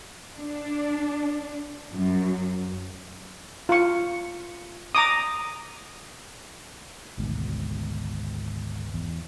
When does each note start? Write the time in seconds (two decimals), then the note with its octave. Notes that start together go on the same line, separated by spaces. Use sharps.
0.36 D4
1.93 F#2
3.69 F4 C#6
4.95 A#5 D6 D#6
7.18 G#1 D2 G#2 B2
8.94 E2